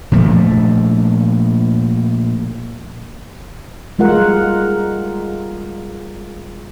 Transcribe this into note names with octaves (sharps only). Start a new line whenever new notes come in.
A#2 F3 A3
G3 G#3 F4 A#4 F#5